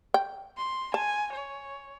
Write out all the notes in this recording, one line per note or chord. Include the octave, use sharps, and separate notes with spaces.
G5
C6
G#5 A5
C#5